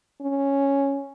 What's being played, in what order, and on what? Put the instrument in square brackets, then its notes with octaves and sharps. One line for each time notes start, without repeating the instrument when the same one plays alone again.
[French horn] C#4